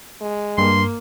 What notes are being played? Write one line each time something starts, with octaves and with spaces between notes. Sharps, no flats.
G#3
G2 A#3 C6